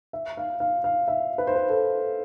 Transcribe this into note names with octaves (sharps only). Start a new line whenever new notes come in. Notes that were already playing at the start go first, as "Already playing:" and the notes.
E5
F5
F5
F5
E5
B4
C5
B4
A4